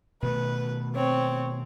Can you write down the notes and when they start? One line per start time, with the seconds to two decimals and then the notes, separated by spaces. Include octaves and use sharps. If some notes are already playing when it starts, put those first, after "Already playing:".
0.22 B2 D#3 A3 B4
0.95 C4 C#5